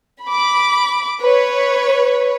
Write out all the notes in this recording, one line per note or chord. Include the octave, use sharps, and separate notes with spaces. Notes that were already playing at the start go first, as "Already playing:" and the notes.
B5 D6
B4 C#5